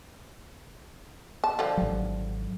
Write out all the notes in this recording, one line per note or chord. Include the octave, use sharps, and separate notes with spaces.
A5
D3 F3 G3
G#1 F#3